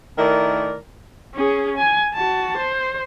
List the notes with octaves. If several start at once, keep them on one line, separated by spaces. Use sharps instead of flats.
D#3 A3 E4 A#4 D5
C#4 G#4
G#5
F#4 A5
C5